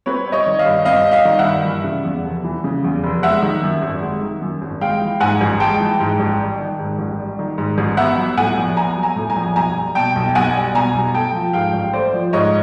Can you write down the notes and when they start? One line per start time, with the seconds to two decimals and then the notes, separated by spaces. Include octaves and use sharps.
0.06 C4 B4 C#5
0.26 G3
0.32 C#5 D#5
0.46 D#3
0.59 D#5 F5
0.66 G2
0.85 C4 D#5 F5
1.05 G3
1.11 D#5 F5
1.25 D#3
1.39 E5 F#5
1.45 G2
1.65 E3
1.84 C#3
2.05 E2
2.24 F1
2.44 E3
2.64 C#3
2.84 E2
3.04 F1
3.23 G#3 E5 F#5
3.42 D#3
3.63 F#2
3.82 G#1
4.02 G#3
4.21 D#3
4.41 F#2
4.62 G#1
4.81 G#3 F5 G5
5.01 E3
5.20 G#2 F#5 G#5
5.41 A1
5.60 G#3 G5 A5
5.80 E3
6.00 G#2
6.20 A1
6.40 G3
6.59 D#3
6.79 G#2
6.99 A1
7.19 G3
7.39 D#3
7.58 G#2
7.78 A1
7.97 B3 E5 F#5
8.18 F#3
8.37 A2 F#5 G#5
8.57 A#1
8.76 B3 G#5 A#5
8.97 F#3
9.03 G#5 A#5
9.16 A2
9.30 G#5 A#5
9.36 A#1
9.56 B1 G#5 A#5
9.76 G3
9.95 B2 G5 A5
10.16 B1
10.35 B1 F#5 G#5
10.55 G3
10.75 B2 G#5 A#5
10.94 B1
11.14 A3 G5 A5
11.35 F3
11.53 G#2 F5 G5
11.73 A1
11.93 A3 C5 D5
12.13 F3
12.33 G#2 C#5 D#5